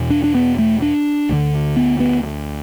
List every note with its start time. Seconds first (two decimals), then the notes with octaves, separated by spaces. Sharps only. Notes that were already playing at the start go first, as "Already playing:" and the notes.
Already playing: E2 B2
0.10 D4
0.24 D4
0.35 B3
0.59 A3
0.82 D4
1.29 D2 D3
1.77 B3
2.00 B3